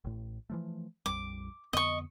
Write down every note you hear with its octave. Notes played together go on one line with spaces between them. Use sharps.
A1 A2
E3 F3 A3
A#1 F2 G3 D6
F2 D3 B3 D#5 C#6